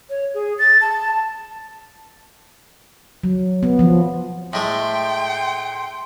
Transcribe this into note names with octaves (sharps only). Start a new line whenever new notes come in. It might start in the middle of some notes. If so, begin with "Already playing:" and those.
C#5
G#4
A6
A5
F#3
B3
F3
A2 G#3 A3 G5 C6